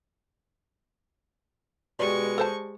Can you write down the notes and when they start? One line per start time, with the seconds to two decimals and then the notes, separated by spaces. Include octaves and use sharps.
1.99 B2 G#3 G4 D5 C#6
2.38 A4 C5 A5